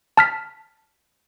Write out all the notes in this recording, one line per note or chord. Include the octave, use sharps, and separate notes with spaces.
A5 F6 B6